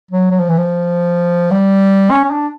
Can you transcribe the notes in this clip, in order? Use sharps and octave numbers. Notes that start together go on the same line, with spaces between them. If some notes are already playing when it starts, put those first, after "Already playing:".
F#3
F#3
F3
E3
F3
G3
C#4
C#4
D4